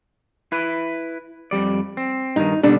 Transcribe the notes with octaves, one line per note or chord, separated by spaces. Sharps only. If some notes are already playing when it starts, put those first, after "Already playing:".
E4 B4
F2 G3 D5
C4
G2 D#3 D#4
B2 D3 G3 D4